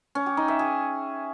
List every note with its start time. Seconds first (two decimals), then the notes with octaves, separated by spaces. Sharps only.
0.15 C#4
0.26 G4
0.37 D#4
0.48 E5
0.59 G#4